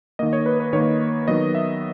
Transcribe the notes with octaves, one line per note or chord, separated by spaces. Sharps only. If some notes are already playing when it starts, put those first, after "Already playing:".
D#3 A#3 D#5
C#5
B4
B4
D#3 A#3 C#5
D#3 F#3 B3 D#5
E5